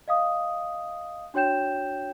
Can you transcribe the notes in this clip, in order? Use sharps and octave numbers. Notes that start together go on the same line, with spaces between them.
D#5 F5 D#6
D4 F#4 C#5 G5 G6 E7